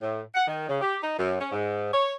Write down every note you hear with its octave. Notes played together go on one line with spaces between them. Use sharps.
A2
F#5
D#3
C#3
G4
D#4
F#2
C#4
G#2
C#5